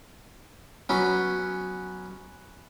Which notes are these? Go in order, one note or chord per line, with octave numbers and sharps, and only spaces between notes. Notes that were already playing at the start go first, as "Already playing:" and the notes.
F#3 B3 C#4